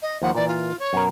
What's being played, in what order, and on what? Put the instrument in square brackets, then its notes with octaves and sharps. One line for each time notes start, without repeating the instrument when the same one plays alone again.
[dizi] D#5
[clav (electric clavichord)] D#2 F3 A#3 [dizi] F#5
[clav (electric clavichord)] A#2 E3 [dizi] D5
[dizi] F4
C#5
[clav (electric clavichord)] F#2 B2 A#4